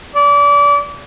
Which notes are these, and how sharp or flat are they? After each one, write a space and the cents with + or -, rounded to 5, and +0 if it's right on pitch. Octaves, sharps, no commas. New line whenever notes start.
D5 -30